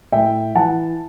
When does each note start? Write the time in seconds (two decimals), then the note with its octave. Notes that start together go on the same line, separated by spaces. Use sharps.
0.12 A2 E5 G5
0.55 E3 F#5 A5